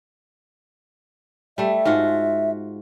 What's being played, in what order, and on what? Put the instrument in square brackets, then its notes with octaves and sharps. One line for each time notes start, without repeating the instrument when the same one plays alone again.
[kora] G3 A3 [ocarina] E5
[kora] G#2 F4 F#4